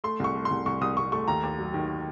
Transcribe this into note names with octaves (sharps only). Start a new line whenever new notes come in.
A3 C6
C2 C#6
A3
C6
C2
C2 C#6
C2 D#6
C2 C#6
A3 C#6
D#2 A#5
D#2
F#3
D#3